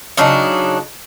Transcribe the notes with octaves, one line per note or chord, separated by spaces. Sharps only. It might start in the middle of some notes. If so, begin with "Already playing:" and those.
C#3 F#3 D4 D#4